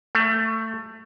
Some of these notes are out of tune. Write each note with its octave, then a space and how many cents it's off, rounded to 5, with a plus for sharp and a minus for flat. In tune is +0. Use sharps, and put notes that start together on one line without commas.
A3 +20